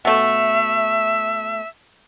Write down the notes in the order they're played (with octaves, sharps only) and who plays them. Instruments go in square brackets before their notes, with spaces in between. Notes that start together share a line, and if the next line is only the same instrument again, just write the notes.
[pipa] B2 A3 [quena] E5